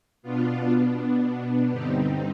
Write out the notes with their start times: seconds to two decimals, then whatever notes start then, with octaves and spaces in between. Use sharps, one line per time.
0.22 B2 B3 D4 F4
1.70 G2 D3 G3 C4 D#4 G4